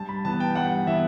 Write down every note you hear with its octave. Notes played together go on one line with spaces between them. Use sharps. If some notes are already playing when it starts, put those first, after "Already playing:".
Already playing: G2 A5
B5
E3 B3 A5
G5
G2 F#5
E3 B3 E5